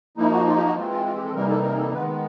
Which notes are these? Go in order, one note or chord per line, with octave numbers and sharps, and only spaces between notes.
F3 A#3 D#4 E4
F#4
F4
G4
F#4
E3 G#3 C4 F4
F4
F4
G4
A4
C3 E3 G3 A#3 D#4 A#4
A4
A#4
A4
D#3 G#3 B3 B4